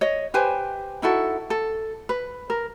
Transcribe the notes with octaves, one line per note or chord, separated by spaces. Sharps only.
C#5 D#5
G4 B4 C5 G#5
D#4 E4 F#4 A4
A4
B4
A#4